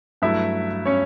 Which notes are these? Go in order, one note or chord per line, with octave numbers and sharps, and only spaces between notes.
G2 F#3 A3 E4 E5
C#4 C#5